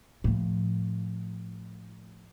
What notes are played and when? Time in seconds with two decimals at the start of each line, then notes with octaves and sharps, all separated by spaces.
0.24 A2 F3